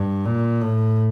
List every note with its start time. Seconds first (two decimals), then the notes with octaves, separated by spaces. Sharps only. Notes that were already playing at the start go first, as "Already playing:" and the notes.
Already playing: G2
0.25 A#2
0.61 A2